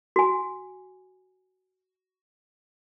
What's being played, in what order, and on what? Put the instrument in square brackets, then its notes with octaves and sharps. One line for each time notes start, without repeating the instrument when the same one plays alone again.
[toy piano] F#4 G#5